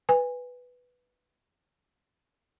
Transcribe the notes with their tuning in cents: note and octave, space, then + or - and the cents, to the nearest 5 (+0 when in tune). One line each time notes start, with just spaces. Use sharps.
B4 +0 G#5 -25